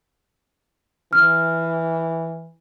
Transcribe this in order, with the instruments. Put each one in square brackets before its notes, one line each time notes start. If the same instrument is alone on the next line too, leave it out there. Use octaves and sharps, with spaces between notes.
[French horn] E3 [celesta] F6